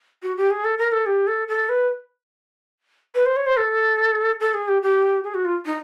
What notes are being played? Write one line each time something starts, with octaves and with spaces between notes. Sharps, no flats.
F#4
G4
G#4
A4
A#4
A4
G4
A4
A4
B4
B4
C5
C#5
C5
A4
A4
G#4
G4
G4
G#4
F#4
F4
D#4